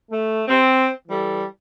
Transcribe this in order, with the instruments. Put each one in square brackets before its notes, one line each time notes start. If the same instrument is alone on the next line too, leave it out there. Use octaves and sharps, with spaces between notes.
[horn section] A3
C4
E3 G3 A4